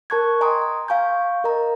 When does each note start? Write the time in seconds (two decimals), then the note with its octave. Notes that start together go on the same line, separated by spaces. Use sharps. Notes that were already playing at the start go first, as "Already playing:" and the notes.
0.10 A#4 A5 C#6 F#6 G#6
0.41 D#5 G5 G#5 A#5 C6 D#6
0.61 A#5
0.88 F5 G#5 C#6 G6
1.44 A#4 D#5 A#5